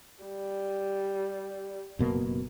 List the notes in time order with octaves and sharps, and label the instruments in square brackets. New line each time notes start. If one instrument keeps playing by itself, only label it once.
[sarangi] G3
[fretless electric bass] F#1 B2 A#3